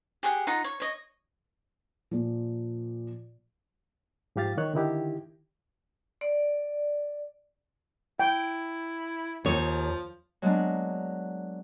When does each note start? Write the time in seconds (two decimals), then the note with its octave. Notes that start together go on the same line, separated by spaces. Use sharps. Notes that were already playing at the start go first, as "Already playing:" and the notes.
0.23 G4 G#4 F#5
0.47 D#4 F4 F#5
0.64 C#5
0.80 C#5 D#5
2.11 A#2 F3
4.36 G#2 F3 G4 F5 A6
4.58 D#3 C#5 F#6
4.74 D3 D#3 D#4 E4 G4
6.21 D5
8.20 E4 G5
9.45 D#2 F3 C#5
10.42 F#3 G#3 A#3 B3 D4